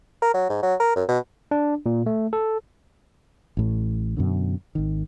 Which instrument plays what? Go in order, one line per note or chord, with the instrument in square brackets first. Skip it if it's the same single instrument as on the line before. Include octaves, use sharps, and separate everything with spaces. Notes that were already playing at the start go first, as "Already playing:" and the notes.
[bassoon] A#4
F#3
G#2
F#3
A#4
F#2
B2
[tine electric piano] D4
A#2
A3
A4
[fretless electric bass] A1 A2
F#2 B2 D3
G#1 D#3